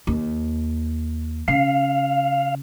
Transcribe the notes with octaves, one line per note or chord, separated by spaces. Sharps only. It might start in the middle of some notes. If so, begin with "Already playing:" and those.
D#2
C#3 F5